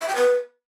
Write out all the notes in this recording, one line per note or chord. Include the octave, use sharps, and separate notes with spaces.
E5
G5
B4